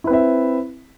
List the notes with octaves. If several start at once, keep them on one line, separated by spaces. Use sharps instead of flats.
C4 E4 B4 E5